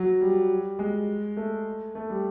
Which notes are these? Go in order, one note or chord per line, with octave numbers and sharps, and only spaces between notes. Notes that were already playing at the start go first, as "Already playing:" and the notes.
Already playing: F#3
G3
G#3
A3
A3
G3